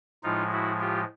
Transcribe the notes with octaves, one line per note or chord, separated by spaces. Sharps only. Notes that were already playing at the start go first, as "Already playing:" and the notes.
A2 F3 G#3 D#4 F4
E4 F#4
F4 G4